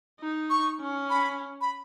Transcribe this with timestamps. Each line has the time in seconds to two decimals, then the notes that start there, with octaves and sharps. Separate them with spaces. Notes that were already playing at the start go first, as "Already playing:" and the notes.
0.20 D#4
0.50 C#6
0.80 C#4
1.10 B5
1.61 B5